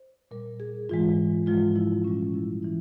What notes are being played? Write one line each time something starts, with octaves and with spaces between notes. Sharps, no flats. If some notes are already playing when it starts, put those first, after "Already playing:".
Already playing: C5
A#2 G3 A#4
G#4
G#2 E3 G#3 F4
G#2 F3 G#3 F4
E4
A#2 G3 C#4
E4
E3 E4